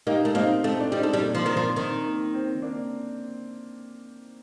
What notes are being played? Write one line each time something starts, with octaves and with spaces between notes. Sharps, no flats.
A#3 D#4 G4
A3
A#3 C4 D#4
A3 C4
D4
G3 C4 D#4
A3
G3
A#3 D4
F3
D#3 C4
F3
D#3 C4
A#3
C4
A#3 D4